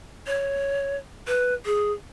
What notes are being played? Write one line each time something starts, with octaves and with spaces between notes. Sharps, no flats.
C#5
B4
G#4